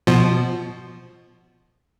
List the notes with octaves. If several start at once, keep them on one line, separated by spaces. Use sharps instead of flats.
B2 F3